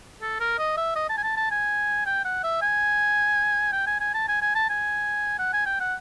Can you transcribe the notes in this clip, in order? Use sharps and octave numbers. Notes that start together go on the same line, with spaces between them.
A4
A#4
D#5
E5
D#5
A5
G#5
A5
A5
G#5
G5
F#5
E5
G#5
G5
G#5
G#5
A5
G#5
G#5
A5
G#5
F#5
G#5
G5
F#5